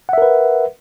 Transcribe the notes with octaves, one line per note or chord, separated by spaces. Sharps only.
A#4 B4 E5 F#5